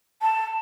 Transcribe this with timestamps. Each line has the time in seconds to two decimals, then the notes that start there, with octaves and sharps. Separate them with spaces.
0.22 A5